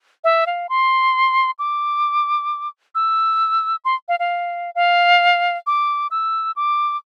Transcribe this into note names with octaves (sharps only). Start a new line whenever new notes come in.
E5
F5
C6
D6
E6
C6
F5
F5
F5
D6
E6
D6